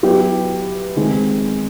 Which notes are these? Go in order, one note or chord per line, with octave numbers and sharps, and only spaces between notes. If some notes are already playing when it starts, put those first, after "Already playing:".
F#3 B3 E4 G4
D#3 G#3 C4